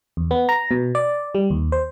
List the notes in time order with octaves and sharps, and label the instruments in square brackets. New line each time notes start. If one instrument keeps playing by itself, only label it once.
[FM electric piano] E2
B3
A#5
B2
D5
G3
D#2
C5